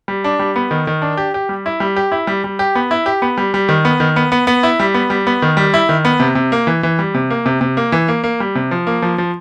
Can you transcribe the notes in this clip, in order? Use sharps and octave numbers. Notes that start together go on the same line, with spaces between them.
G3
D4
G3
B3
D#3
D#3
D4
G4
G4
G3
E4
G3
G4
E4
G3
G3
G4
B3
E4
G4
B3
G3
G3
D#3
B3
D#3
B3
B3
B3
E4
G3
B3
G3
B3
D#3
G3
E4
D#3
B3
C3
C3
A#3
E3
E3
G3
C3
A#3
C3
C3
A#3
E3
A#3
A#3
G3
C3
F3
A#3
F3
F3